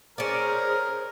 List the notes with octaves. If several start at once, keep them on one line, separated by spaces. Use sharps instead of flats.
C#4 G#4 A#4 C5 D5